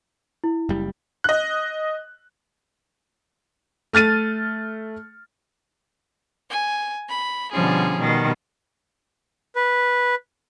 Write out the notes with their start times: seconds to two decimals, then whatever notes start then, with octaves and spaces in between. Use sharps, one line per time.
0.44 E4
0.69 F#1 G3
1.24 D#5 F#6
3.93 A3 F6 A6 D#7
6.49 G#5
7.08 B5
7.51 B2 D3 F3 G3 C#4 G#4
7.97 B2 D#3 G3
9.56 B4